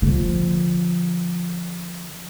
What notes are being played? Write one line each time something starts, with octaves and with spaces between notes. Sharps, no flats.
D3 F3